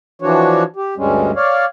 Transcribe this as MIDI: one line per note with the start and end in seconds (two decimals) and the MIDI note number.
0.22 0.63 52
0.22 0.63 53
0.22 0.63 62
0.22 0.63 66
0.22 0.63 73
0.76 0.94 67
0.97 1.31 38
0.97 1.31 43
0.97 1.31 55
0.97 1.31 56
0.97 1.31 61
1.36 1.65 73
1.36 1.65 74
1.36 1.65 77